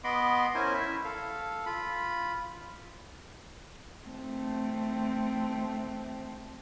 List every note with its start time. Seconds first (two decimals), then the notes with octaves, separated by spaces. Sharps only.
0.04 B3 D#5 B5 C6 D6
0.55 C#4 E4 A#4 C5 G#5
0.74 E4 E5
1.05 A4 F5
1.66 F4 B5
4.08 A3 C4